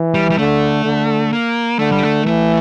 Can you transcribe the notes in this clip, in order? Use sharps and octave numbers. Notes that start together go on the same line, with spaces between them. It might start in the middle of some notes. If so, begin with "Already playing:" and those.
Already playing: E3
G3
G3
D3 A3
D3
A#3
D3 A3
G3
A3
E3 A3